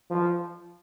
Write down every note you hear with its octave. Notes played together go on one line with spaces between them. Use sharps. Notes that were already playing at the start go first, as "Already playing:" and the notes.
F3